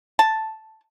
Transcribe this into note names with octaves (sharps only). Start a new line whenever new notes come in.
A5